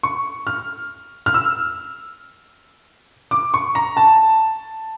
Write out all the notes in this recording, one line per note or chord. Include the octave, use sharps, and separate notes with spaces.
C#6
F6
F6
E6
D6
C#6
A#5
A5